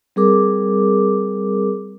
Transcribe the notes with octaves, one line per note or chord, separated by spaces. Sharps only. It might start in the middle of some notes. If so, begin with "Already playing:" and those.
G3 C4 G#4 A#4 D6